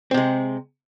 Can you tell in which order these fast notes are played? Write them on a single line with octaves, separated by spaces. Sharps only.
C4 C3 G#3